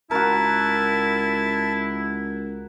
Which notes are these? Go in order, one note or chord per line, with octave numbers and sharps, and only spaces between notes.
C#2 E4 F#4 A#4 A5